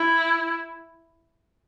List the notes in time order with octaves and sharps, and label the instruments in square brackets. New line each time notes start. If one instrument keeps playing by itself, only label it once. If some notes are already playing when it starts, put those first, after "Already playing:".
Already playing: [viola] E4